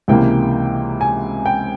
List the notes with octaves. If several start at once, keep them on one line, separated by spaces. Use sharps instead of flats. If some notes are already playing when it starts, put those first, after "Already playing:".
C#2 C3 E3 A#3 G5
G#5
G5